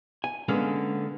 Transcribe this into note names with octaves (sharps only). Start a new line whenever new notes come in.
G#5
D3 G#3 A#3 B3 C#4